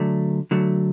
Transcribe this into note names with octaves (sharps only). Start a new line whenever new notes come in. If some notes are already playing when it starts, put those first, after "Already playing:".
Already playing: D3 F#3 A3
D3 F#3 A3